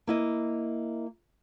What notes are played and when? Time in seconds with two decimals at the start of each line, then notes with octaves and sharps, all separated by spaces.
0.07 A#3 E4 D#5